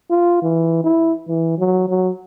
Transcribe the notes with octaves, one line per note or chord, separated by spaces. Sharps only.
F4
E3
E4
E3
F#3
F#3